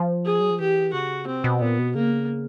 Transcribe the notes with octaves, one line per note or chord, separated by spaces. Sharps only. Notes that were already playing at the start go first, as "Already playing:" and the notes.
Already playing: F3
G#4
F#3
F3
E3 G4
C#3 F#4
C3 C4
B2
A#2 B3
B2
C#3 A#3